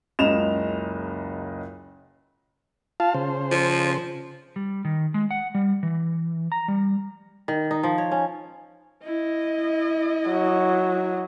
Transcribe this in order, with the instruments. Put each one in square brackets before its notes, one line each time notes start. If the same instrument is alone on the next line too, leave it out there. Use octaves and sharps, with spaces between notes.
[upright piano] F#1 C#2 D#5 E7 F7
[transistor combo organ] F4 F5 A5
C#3 C5
[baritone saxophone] F3
[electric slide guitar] G3
D#3
G#3
F#5
G3
E3
A#5
G3
[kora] D#3
D#4
F3
C#5
C#4
[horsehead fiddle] E4 D#5
[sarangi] F#3